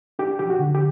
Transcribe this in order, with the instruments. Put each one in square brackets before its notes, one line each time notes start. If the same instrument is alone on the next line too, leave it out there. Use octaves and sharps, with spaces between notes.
[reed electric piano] D4 G4
F3 G4
F#4
D3
G4